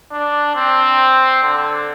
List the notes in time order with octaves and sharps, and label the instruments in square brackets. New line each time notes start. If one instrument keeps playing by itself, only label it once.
[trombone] D4
C4
D3